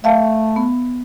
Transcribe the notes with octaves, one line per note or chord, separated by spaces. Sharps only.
A3 E5 F5 A5
B3